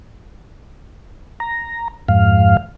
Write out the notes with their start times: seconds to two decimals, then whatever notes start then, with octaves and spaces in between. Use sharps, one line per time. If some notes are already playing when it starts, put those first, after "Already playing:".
1.40 A#5
2.08 F2 G#2 F5